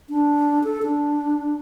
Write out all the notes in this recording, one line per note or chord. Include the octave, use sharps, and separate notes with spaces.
D4
A4
D4